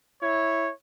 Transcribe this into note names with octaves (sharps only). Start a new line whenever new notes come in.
E4 C#5